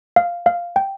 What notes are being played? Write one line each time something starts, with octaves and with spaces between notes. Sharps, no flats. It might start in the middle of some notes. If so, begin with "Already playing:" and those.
F5
F5
G5